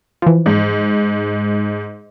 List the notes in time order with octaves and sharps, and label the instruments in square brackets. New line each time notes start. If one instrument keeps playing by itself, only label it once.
[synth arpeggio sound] E3 F3
[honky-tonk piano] G#2